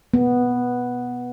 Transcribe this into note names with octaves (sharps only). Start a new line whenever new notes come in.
B3